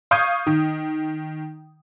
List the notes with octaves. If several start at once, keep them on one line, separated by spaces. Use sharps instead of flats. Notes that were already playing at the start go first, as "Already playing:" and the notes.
F5 C#6 D#6 G6 G#6 D#7
D#3